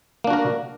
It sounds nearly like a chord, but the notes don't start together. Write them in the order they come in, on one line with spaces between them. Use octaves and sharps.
A#3 D4 F#4 A#4